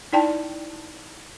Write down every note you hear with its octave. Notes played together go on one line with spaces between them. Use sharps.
D#4 E4 D5 G5 A5